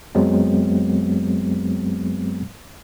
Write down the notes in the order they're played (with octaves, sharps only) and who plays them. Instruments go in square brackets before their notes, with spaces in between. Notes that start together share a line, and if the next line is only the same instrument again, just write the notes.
[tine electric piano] F#2 F#3 G#3 B3 C4